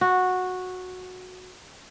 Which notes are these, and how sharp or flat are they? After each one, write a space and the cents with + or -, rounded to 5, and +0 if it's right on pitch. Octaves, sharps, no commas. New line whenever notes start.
F#4 -10